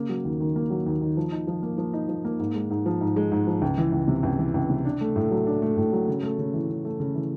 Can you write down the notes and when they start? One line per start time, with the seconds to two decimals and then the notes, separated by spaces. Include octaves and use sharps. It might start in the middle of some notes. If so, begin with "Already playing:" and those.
Already playing: C#3 A#3
0.09 F#3
0.24 D#2
0.40 D#3
0.56 A#3
0.70 F#3
0.86 D#2
1.01 D#3
1.17 F3
1.32 D#4
1.47 F3
1.63 A#3
1.78 F3
1.93 D#4
2.09 F3
2.25 A#3
2.39 G#2
2.54 G#3
2.70 G#2
2.86 F3
3.01 G#2
3.16 G#3
3.32 G#2
3.47 F3
3.62 C#2
3.78 E3
3.92 C#2
4.08 C3
4.23 C#2
4.39 E3
4.54 C#2
4.70 C3
4.85 D4
5.01 A3
5.16 A2
5.31 F#3
5.46 D4
5.62 A3
5.77 A2
5.93 F#3
6.08 C#3
6.23 A3
6.39 C#3
6.54 E3
6.69 C#3
6.85 A3
7.00 C#3
7.15 E3